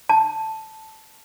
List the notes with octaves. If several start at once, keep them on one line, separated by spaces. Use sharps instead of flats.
A5